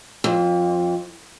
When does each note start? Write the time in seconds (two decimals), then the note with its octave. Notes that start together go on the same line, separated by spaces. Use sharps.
0.24 F2